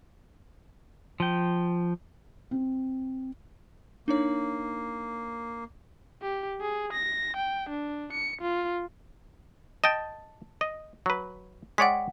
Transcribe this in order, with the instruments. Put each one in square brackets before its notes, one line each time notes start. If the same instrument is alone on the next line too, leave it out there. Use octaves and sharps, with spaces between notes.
[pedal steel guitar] F3 G5
[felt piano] C4
[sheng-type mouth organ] A#3 [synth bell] D4 D#4 C#5
[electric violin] G4
G#4
A#6
G5
D4
C#7
F4
[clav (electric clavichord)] D#5 G5 [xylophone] A5 A6
[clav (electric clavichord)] D#5
F#3 B4
[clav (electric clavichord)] G#3 C#5 D5 [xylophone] F#5 G5 B6